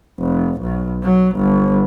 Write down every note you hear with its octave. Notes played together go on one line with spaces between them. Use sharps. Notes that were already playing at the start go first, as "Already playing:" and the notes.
F1
B1
F#3
G1